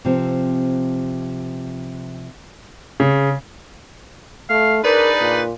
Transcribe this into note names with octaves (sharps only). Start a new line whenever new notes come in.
C3 F3 C4
C#3
A3 F5
D4 D#4 G#4 A#4 B4 D5
A#2